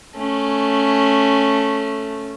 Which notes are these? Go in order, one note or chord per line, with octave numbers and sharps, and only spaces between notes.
A3 C#4